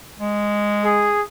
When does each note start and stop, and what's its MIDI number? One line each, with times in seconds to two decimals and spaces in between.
0.19 1.12 56
0.84 1.22 68